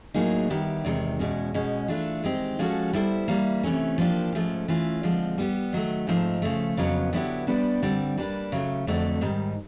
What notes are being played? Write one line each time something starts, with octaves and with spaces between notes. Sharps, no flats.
A2 F#3 A#3 D#4 G#4
D#3 G3 B3 E4 G4
E2 C3 D#3 G#3
E2 B2 G#3 C#4
B2 G#3 C#4
E3 A3 D4 F4
D#3 G#3 C4 D#4 G4
F3 G#3 C#4 F#4 A4
G3 B3 E4 A4 C5
E3 G3 A#3
C3 E3 A3 C#4
F3 A#3 D4 G4
G#2 F3 A3 C#4
E3 A3 C#4 F4
D3 F3 G#3 C4
G3 B3 E4 G4
D#3 F#3 A3
G#2 F3 A3 C4 D#4
C#3 F3 A3
F2 C#3 F#3 B3
D3 F#3 B3 E4 G4
G3 B3 D4 G4
G2 D3 G3 C4
G3 A#3 D4 G4 B4
C#3 F#3 A3
F2 D3 F#3 A3 C4
G#2 D#3 G3